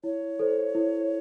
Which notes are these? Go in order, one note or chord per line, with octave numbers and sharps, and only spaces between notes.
E4 C#5
A4 C5
E4